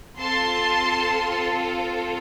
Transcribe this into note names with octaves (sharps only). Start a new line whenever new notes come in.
C4 F4 A4 A5 C6